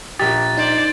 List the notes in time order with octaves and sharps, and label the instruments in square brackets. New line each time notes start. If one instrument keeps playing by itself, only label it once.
[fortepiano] A#1 G4 [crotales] A6
[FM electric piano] D#4 [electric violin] C5 D5